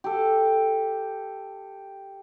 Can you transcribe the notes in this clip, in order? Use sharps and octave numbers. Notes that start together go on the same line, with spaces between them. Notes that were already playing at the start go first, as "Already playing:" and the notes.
G4 A4